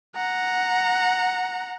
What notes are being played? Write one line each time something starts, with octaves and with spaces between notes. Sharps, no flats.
F#5 A#5